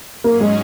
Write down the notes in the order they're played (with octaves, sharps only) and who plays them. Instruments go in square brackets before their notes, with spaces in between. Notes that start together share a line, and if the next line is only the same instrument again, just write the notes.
[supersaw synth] G#2 F#3 C#4 G#4 [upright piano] A#3
[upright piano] G#3